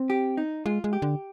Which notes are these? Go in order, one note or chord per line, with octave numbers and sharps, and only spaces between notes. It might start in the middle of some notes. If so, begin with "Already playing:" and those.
Already playing: C4
G4
D#4
G#3 F4
G#3
G4
D3